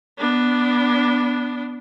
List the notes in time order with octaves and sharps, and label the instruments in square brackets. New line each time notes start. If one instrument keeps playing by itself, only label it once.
[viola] B3 D4